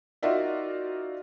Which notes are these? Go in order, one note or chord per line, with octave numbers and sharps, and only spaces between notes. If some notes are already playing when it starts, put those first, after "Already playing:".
D#4 F4 F#4 A#4 D5 E5